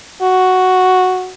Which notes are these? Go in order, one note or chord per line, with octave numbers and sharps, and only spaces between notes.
F#4